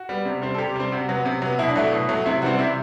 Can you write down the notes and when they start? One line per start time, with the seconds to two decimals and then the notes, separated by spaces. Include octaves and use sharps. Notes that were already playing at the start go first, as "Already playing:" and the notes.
Already playing: F#4
0.09 G3 B3
0.25 C3
0.42 G3 C4
0.55 A4
0.58 C3 G4
0.75 G3 C4
0.92 C3 F#4
1.09 F#3 B3
1.25 C3
1.42 F#3 B3
1.59 B2 E4
1.69 D4
1.76 F#3 A3 E4
1.92 B2
2.09 F#3 A3
2.26 C3 E4
2.42 E3 G3 C4 F#4
2.58 C3 E4